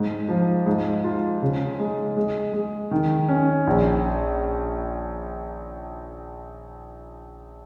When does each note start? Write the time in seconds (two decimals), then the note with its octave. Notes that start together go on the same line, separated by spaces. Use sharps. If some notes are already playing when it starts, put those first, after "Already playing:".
Already playing: G#2
0.28 F3
0.66 G#2
1.04 F4
1.42 C#3
1.79 G#3
2.17 G#3
2.53 G#3
2.91 D#3
3.28 C#4
3.67 A#1